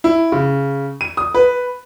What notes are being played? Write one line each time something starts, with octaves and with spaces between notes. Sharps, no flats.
E4
C#3
D#7
D#6
B4